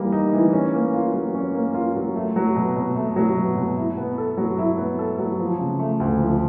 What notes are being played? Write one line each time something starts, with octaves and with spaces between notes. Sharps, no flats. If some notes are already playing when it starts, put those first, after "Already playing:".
Already playing: E3 G3 A#3 D#4
D#4
E3
C#4
A#3
F4
F#3
C#4
A#3
F4
F#3
A3
F#3
B2
B2
A3
F#3
B2
B2
E4
B3
A4
F#3
E4
B3
A4
F#3
F3
C#3
A3
D2
F3